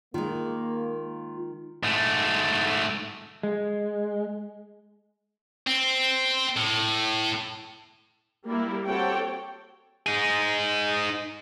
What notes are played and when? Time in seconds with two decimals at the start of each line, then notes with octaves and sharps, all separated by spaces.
0.14 D#3 G#3 A#3 F4
1.83 G#2 A3
3.43 G#3
5.67 C4
6.57 A2
8.47 G3 A#3 E4
8.86 C4 F#4 G4 A4 C#5 G5
10.06 D#4 G#4